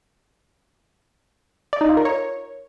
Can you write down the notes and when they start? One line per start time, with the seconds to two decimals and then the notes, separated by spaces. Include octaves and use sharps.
1.73 D5
1.81 D#4
1.89 F4
1.97 A#4
2.05 C#5